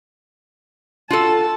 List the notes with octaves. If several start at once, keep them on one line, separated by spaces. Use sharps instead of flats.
F4 F#4 A4 A5